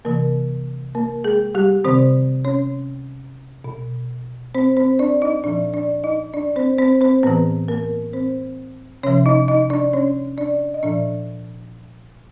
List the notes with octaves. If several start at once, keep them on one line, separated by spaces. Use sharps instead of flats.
C3 E3 A#3 A#4
A#3 A#4
G#3 G#4
G3 G4
C3 D#3 C4 C5
C#4 C#5
B2
C4 C5
C4 C5
D4 D5
D#4 D#5
A#2 F3 D4 D5
D4 D5
D#4 D#5
D4 D5
C4 C5
C4 C5
C4 C5
A2 E3 B3 B4
A#3 A#4
C4 C5
C3 F3 C#4 C#5
D#4 D#5
D#4 D#5
D4 D5
C#4 C#5
D4 D5
D#5
A#2 F3 D4 D5